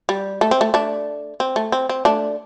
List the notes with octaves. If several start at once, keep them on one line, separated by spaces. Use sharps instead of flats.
G3
A3
C4
A3
A3 D4
C4
A3
C4
C4
A3 D4